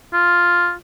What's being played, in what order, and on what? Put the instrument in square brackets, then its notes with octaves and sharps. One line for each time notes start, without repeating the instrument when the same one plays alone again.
[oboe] F4